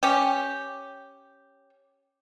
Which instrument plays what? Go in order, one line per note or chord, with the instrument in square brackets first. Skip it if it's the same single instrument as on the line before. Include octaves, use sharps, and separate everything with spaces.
[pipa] C#4 G4